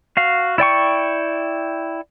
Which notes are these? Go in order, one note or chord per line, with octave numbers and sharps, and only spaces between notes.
F#4 F5
E4 D5 G5 C#6